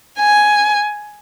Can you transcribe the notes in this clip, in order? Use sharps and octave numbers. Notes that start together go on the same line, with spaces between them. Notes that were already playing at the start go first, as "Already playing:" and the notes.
G#5